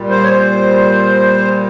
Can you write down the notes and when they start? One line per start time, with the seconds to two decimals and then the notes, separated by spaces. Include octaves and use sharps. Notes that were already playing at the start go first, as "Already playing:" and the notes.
Already playing: A#2 G3
0.10 C5
0.24 C#5
0.29 C5